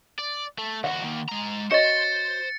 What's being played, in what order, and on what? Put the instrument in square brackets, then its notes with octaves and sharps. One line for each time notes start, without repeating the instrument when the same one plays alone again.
[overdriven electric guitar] D5
A3
[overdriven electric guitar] D#2 F#4 [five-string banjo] F#5
[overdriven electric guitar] D#3 A#3
G#3 A#5
[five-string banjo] F#4 C#5 D#5 [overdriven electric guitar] C5 [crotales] A6 C#7